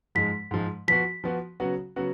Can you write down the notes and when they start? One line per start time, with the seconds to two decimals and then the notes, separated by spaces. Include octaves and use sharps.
0.15 G#2 F3 G#3 B6
0.51 G#2 F3 G#3
0.88 F3 B3 F#4 B6
1.24 F3 B3 F#4
1.60 C#3 F#3 B3 F#4
1.96 C#3 F#3 B3 F#4